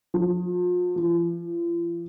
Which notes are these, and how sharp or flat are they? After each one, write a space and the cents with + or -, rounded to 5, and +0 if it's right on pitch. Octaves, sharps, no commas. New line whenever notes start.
F3 +40
F3 -40